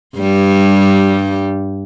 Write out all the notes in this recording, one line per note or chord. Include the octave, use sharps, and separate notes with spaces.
G2 G3